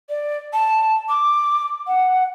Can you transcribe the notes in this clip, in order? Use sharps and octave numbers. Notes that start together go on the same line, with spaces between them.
D5
A5
D6
F#5